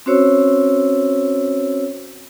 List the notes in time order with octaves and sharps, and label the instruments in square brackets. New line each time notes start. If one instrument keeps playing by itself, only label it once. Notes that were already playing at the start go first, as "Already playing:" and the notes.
[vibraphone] C4 C#4 F#4 C5 C#5 E6